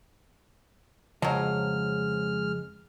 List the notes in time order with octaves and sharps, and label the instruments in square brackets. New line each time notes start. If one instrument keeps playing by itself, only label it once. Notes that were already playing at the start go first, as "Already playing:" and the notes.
[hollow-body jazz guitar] F2 C#3 D#5 [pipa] F3 F#3 [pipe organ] G#3 F6